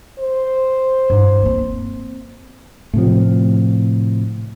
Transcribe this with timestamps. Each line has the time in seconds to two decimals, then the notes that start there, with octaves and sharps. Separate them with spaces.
0.19 C5
1.10 G2
1.42 A#3 C4
2.94 A2 C3 F3